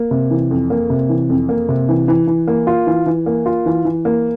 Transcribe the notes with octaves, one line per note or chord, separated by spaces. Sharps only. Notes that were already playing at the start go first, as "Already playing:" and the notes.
Already playing: A#3
C3
E3
F2
A#3
C3
E3
F2
A#3
C3
E3
E3
E3
A#3
F4
E3
E3
A#3
F4
E3
E3
A#3